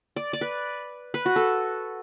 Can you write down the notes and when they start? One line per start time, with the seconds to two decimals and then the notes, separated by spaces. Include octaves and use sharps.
0.16 D5
0.33 D5
0.41 B4
1.14 B4
1.26 F#4
1.36 A4